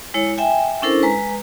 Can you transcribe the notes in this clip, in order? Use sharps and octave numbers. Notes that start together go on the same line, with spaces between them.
G#3 E4 C#5
E5 G5 G#5
C#4 D4 E4 A4 A#4 C5
G#3 B4 A#5